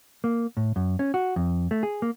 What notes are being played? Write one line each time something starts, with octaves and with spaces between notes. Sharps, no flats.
A#3
A2
F#2
C#4
F#4
F2
A3
G#4
A#3